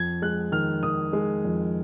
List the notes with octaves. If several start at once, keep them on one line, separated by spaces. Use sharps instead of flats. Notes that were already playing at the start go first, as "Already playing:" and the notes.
Already playing: F2 G#6
G#3 F#6
D#3 F6
D#3 D#6
G#3
F2